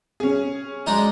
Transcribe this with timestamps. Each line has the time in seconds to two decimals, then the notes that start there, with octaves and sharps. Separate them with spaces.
0.20 C#4 G#4
0.87 G#3 D4 D#4